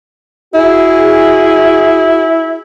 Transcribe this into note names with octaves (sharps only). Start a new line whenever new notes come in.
E4 F#4 G#4